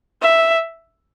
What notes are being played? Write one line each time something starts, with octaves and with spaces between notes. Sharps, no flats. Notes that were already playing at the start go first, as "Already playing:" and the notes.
E5